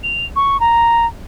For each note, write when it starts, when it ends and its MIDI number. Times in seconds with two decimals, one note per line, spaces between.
0.03 0.25 101
0.36 0.60 85
0.60 1.06 82